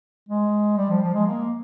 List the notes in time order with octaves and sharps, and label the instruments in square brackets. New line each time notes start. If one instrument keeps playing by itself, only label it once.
[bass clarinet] G#3
G3
F3
F3
G#3
A#3